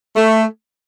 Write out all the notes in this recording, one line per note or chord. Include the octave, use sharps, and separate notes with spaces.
A3